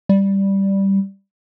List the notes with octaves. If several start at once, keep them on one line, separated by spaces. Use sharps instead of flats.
G3